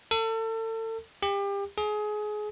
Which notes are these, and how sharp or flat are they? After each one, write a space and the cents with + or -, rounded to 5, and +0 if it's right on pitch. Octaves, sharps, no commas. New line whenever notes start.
A4 +35
G4 +30
G#4 +25